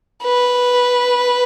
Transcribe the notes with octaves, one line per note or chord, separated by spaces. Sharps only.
B4